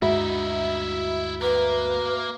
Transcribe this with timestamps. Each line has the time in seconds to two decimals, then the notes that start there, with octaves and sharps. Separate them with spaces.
0.02 D2 G2 G#3 D#4 E4 F#4 E5 B5
1.41 A#3 A#4 B4